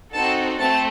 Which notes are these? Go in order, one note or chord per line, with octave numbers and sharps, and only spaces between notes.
C4 D#4 F#4 A4 A5
A3 C4 A5